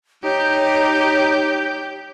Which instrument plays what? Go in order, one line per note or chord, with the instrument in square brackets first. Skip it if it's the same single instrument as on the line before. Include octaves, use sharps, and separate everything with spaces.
[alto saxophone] D#4 [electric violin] G4 G6 [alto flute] C#5